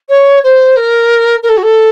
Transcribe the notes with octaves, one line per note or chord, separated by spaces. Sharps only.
C#5
C5
A#4
A#4
A4
F#4
A4